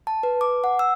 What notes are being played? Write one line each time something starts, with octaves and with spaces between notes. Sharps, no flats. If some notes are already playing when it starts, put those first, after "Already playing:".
A5
B4
D6
F#5
E6